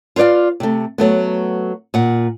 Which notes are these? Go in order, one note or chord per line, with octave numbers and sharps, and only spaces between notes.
F4 B4 C#5 D5 F5
C3 A3
F#3 A3 B3
A#2 F#5